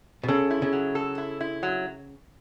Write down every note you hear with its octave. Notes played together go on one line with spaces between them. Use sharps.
B2
C#3 A4
E4
C#3
F#3
A4
E4
E4
F#3